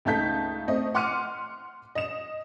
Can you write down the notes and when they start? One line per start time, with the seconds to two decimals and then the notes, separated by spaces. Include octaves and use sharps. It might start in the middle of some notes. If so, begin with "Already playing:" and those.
0.05 C#2 A3 D#4 A4 G6 B6
0.68 A3 C4 D#5
0.94 F#5 C6 D6 F6 C#7 D#7
1.95 D#5 E7